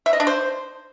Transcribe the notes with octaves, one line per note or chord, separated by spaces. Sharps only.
E5
D#5
D4
C5